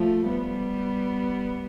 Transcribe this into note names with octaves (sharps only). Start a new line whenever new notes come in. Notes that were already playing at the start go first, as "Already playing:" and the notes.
Already playing: F3 A3
G3 B3